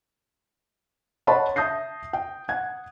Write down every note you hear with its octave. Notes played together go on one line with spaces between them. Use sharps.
C#5 D#5 F#5 A5 B5 C6
E5 A5 D#6 G6 A#6 C7
G5
F#5 G#6